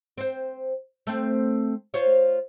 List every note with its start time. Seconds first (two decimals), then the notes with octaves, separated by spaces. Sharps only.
0.18 C4 C5
1.07 A3 C4
1.94 F4 C5 C#5